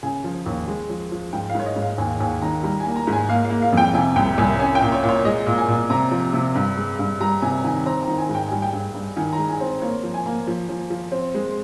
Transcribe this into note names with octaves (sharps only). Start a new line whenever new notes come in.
C#3 G#5
F3
D#2
G#3
F3
F3
G#2 G5
F5
G#2 C#5
D#5
G#2
F5
D#2 G#5
D#2 G#5
D#3 A#5
G3 A#5
G#5
A#3
A#5
G#2
G#5
A#3 F5
F5
A#3
F5
F2 G5
C3 G#5
C2 G5
C2 G#5
C#4 G#5
G5
A#2
C#5
A#2
C#5
G#3 D#5
A#2
G#5
A#2
C3 A#5
F3
C3
G2
G#3
G2
G3 A#5
C3 G#5
D#3 G#5
C4 A#5
A#5
D#3
G#5
G#2
G5
G3 G#5
G5
G2
G2
D#3 G#5
A#5
G#3
G#5
C4
A#3 C#5
F3
G#5
A#3
F3
F3
F3
C4
G#3